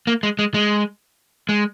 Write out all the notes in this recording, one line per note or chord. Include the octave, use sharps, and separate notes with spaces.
A#3
G#3
G#3
G#3
G#3